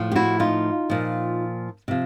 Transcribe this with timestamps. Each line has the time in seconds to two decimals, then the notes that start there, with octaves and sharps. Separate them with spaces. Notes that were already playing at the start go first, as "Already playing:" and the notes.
Already playing: A2 F3
0.12 G4
0.15 E4 F#4
0.40 D#4 F4
0.90 A#2 F3
1.88 C3 F3